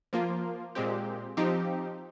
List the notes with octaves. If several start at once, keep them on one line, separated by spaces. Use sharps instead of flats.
F3 A#3 F4
A#2 G#3 C4 G4
F3 C4 D#4 G4